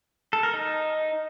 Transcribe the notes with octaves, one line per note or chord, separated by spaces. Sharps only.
A4
A#4
D#4